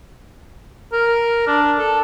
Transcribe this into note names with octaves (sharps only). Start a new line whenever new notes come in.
A#4
D4
A4